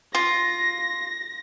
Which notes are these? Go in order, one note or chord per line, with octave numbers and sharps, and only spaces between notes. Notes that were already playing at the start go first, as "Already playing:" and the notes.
F4 A#6